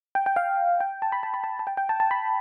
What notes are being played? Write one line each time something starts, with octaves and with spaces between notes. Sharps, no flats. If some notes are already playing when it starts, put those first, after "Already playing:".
G5
G5
F5
G5
A5
B5
A5
B5
A5
A5
G5
G5
A5
A5
B5